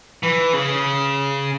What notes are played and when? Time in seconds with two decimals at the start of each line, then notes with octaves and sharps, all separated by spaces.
0.23 E3
0.53 C#3